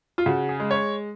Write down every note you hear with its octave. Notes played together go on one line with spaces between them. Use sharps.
F4
C#3 F#4
G#4
G#3
C#5